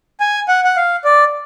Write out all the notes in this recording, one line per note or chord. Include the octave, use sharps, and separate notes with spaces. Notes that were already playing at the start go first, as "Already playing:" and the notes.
G#5
F#5
F#5
F5
D5